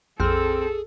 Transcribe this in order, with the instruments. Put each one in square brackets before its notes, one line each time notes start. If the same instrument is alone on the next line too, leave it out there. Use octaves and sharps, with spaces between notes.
[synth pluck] A#1 F2 F6 [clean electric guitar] C4 [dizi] G#4 [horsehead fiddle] A4